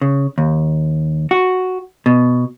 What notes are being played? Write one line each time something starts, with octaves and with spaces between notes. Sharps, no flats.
C#3
D#2
F#4
B2